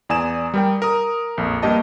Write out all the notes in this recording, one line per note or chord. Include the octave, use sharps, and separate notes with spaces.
E2 D5 G#5 D#6 E7
G3 A#4 G5
A#4 D#6
A#1 F2
G2 A#3 G4 D#5 A5